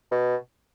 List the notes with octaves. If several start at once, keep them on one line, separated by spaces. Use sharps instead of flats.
B2